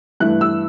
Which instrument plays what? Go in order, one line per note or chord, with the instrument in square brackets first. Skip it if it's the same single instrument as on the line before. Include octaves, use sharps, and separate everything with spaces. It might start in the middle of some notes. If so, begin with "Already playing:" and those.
[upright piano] G2 E3 A3 E4 F#6
E6